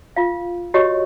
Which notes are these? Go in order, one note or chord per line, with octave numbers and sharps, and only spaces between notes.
F4 F5
F#4 G4 C#5 D#5 C#6 D#6